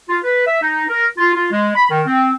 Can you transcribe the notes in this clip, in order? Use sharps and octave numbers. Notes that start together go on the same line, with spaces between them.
F4
B4
E5
D#4
A#4
F4
F4
G#3
B5
D#3
C4